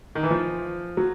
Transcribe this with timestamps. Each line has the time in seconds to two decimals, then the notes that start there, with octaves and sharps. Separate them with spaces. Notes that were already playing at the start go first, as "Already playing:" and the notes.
0.15 D#3
0.23 E3
0.30 F3
0.97 F#3